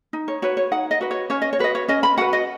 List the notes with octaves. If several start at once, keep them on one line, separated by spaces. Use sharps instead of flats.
D#4
C#5
F#4 B4 C#5
C#5
D#4 F#5
D#5
F#4 B4
C#5
C#4 C#5
D#5
C#5
F#4 B4 D#5
C#5
C#4 D#5
B5
F#4 B4 F#5
D#5